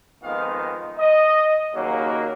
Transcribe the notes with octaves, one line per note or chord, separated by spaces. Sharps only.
F2 D#3 G#3 B3 D#4 F5
D#5
D#2 C#3 F#3 A#3